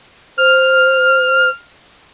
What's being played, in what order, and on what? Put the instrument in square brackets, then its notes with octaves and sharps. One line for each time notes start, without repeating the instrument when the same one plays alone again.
[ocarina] C5 [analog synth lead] F6